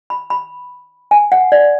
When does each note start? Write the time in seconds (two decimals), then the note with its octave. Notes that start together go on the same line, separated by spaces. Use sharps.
0.10 B5
0.30 B5
1.11 G#5
1.32 F#5
1.52 D5